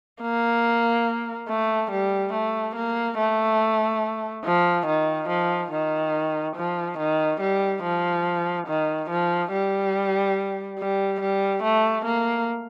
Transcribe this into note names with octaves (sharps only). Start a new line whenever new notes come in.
A#3
A3
G3
A3
A#3
A3
F3
D#3
F3
D#3
F3
D#3
G3
F3
D#3
F3
G3
G3
G3
A3
A#3